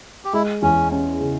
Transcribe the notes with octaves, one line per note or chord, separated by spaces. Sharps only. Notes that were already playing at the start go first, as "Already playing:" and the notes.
G4
G#3 E4
E2 C#4
C#4
C#3